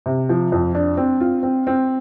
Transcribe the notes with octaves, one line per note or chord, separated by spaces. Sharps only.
C3
F3
F2
D4
C4
F4
C4
C4